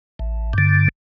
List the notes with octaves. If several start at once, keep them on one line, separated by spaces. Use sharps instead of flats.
A1
G2 D3